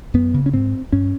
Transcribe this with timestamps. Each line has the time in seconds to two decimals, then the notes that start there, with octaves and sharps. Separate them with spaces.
0.14 F#2 B3
0.34 C#3
0.46 C#4
0.53 G#2 C4
0.92 G2 C#4